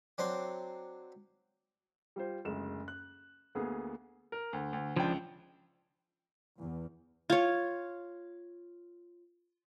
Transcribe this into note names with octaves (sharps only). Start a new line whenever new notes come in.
F#3 C4 D4 C5 C6 D6
G3 F4 C5
F#1 D2 G#3 E7
F#6
D2 A#3 B3 G#4
A#4
D2
D2
C#2 F3 D4 G5
E2
F4 C#5